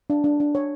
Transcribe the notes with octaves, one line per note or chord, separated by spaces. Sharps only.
D4
D4
D4
C#5